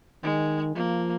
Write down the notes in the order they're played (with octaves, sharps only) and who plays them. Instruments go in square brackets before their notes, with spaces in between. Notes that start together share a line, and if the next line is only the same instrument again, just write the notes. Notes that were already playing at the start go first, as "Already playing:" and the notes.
[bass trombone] D#3 [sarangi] G#3
[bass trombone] F3 [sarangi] A#3